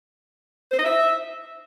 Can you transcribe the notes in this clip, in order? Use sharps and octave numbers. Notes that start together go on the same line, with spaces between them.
C5
D#5
E5